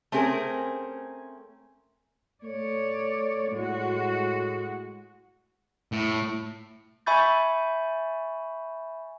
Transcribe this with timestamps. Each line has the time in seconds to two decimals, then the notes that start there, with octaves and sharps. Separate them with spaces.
0.12 A3 C4 C#4 G#4 A#4 C5
2.44 A3 C#5 D5
3.52 A2 G#3 F#4
5.92 A2
7.06 E5 G#5 B5 C#6 G6 A6